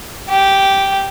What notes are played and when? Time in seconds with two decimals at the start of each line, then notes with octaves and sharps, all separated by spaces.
0.29 G4